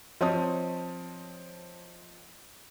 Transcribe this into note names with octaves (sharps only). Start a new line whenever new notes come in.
F3 C4 C#5 D#5 A5 D#6